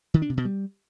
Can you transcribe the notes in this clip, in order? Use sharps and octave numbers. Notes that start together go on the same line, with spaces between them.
D#3
D4
C3
B2
G3